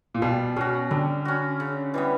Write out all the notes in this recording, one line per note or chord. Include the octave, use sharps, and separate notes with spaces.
A#2
B2 G3
B2 C#4 F#4
D3 G3
C#4 F#4
C#3
E3 G3 B3